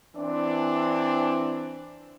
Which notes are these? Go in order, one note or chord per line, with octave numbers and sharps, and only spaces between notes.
E3 C4 D4